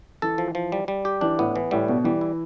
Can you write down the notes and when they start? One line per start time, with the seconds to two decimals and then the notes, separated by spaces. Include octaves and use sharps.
0.22 E3 A4
0.38 F3
0.55 F3
0.72 G3
0.88 G3
1.05 G4
1.21 E3 D4
1.39 A2 B3
1.56 E3
1.71 A2 G3
1.88 B2 D3
2.04 E3 G3
2.21 E4